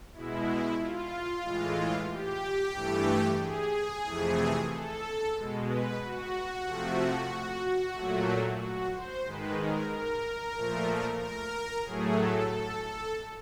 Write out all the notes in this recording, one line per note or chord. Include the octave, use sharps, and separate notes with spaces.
B2 G#3 E4
F4
A2 E3 G#3
G4
G2 E3 A3
G#4
F2 C3 E3 A3
A4
B2 G#3
B4
F#4
C3 F3 A3
A#2 F#3 A3
F#4
C5
G#2 D#3 G#3 B4
A#4
A#4
A#2 F3 A3
A#4
A2 F#3 A3 G#4
A4
A4
A4